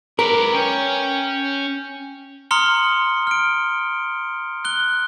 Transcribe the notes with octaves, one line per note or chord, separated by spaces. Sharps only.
A#4 B4 D5
C#4 G5
A#5 C6 D#6 F6 C#7 G7
F6 D7
F#6 G7